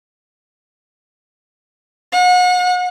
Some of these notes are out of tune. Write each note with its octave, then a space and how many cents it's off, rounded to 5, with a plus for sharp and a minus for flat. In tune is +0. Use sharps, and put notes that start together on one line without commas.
F#5 -35